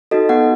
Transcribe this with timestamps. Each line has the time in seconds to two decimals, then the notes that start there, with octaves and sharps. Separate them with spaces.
0.11 D#4 F#4 A4 D#5
0.29 B3 F#5